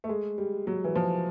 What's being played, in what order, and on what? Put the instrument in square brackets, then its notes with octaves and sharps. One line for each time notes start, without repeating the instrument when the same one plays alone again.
[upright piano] A3
G#3
G3
F#3
E3
F3